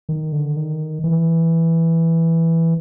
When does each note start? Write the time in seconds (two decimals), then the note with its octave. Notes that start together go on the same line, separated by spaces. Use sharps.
0.09 D#3
0.32 D3
0.56 D#3
1.04 E3